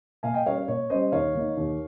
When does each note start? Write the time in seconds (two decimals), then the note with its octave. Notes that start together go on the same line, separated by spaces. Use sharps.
0.23 A#2 F5 G#5
0.34 D#5 G5
0.46 G3 C#4 C#5 F5
0.57 C#5
0.68 A#2 C#5
0.90 G3 C#4 C5 D#5
1.12 D#2 C#5 F5
1.35 D#3 A#3 D#4
1.57 D#2